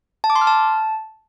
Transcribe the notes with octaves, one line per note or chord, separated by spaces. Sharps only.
A5
D6
C6
F6
A5